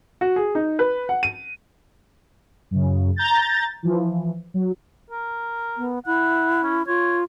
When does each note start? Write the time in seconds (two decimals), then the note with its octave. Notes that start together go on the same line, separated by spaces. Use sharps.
0.21 F#4
0.36 G#4
0.55 D#4
0.79 B4
1.09 F#5
1.23 D#7
2.71 F#2 C#3
3.16 A#5 G6 A6
3.83 E3 F3
4.54 F#3
5.11 A#4
5.77 B3
6.06 E4 F#5
6.63 C#4
6.87 F4 C#5